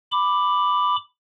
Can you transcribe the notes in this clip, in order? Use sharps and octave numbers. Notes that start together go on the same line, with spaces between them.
B5 D6